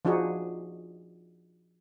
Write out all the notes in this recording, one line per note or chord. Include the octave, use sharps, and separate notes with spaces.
F3 D4 D#4 F#4 G#4